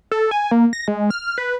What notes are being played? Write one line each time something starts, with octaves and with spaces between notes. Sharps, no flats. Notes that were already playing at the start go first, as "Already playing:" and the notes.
A4
G#5
A#3
A#6
G#3
F6
B4